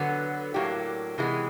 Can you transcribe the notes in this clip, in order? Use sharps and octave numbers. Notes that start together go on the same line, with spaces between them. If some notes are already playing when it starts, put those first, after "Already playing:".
Already playing: D3 F#3 B3
A2 F#3 A#3 D4 G4
C3 E3 G#3 B3